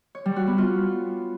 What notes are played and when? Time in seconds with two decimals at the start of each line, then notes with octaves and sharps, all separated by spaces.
0.15 C#5
0.26 G3
0.36 F#4
0.47 B3
0.58 F4